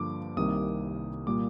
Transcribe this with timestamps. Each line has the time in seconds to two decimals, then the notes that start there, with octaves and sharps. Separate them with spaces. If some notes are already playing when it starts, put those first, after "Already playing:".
Already playing: G2 D3 F3 A#3 D6
0.37 C2 C3 D#3 G3 A#3 D#6
1.27 A#2 G3 A#3 D6